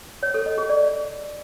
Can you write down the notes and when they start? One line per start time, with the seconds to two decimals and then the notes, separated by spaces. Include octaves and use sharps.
0.23 C#5
0.34 A4
0.46 D#5
0.58 G#4
0.70 D5